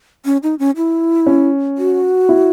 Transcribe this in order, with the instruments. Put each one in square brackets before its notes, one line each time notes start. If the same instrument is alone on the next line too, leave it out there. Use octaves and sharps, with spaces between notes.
[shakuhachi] C#4
D#4
C#4
E4
[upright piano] C#4
[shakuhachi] F#4
[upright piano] E4